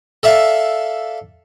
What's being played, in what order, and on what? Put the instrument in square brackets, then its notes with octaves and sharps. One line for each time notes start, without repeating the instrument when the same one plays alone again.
[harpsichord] A4 D5 E5 F5